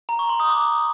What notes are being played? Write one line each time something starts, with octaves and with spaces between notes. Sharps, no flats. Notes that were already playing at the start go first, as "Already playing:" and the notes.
A#5
C#6
C6
D#6
D6